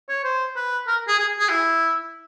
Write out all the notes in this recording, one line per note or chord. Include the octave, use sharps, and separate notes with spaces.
C#5
C5
B4
A#4
G#4
G#4
G#4
E4